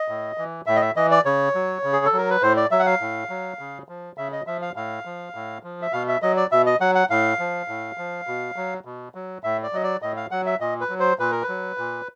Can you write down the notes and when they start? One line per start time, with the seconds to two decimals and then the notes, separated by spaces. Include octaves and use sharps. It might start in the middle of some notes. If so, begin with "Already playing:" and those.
Already playing: D#5
0.08 A2
0.38 E3
0.66 A2 E5
0.76 D#5
0.81 E5
0.96 E3 D#5
1.11 D5
1.25 C#3 C#5
1.55 F#3
1.83 C#3
1.93 G#4
2.05 A4
2.13 F#3 A#4
2.30 B4
2.42 A2 C5
2.57 D5
2.71 F#3 E5
2.79 F#5
2.86 F5
3.01 A2
3.30 F#3
3.59 C#3
3.89 F3
4.18 C#3 E5
4.32 D#5
4.47 F3 E5
4.62 F5
4.76 A2 F5
5.05 F3
5.35 A2
5.63 F3
5.82 E5
5.93 B2 F5
6.08 E5
6.22 F#3 D#5
6.37 D5
6.52 B2 E5
6.66 D#5
6.80 F#3 F#5
6.95 F#5
7.10 A2 F5
7.39 F3
7.68 A2
7.98 F3
8.27 B2
8.56 F#3
8.85 B2
9.15 F#3
9.44 A2 E5
9.63 D5
9.73 F#3 D#5
9.83 D5
10.02 A2 D#5
10.17 F5
10.31 F#3 F#5
10.46 E5
10.60 A#2 D#5
10.81 B4
10.89 F#3
11.00 C5
11.19 A#2 B4
11.31 A#4
11.43 B4
11.49 F#3
11.78 A#2